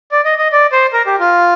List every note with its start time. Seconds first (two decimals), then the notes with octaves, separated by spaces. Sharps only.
0.12 D5
0.25 D#5
0.38 D#5
0.52 D5
0.72 C5
0.93 A#4
1.06 G4
1.20 F4